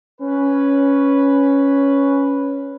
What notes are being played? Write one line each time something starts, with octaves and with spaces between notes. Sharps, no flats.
C#4 B4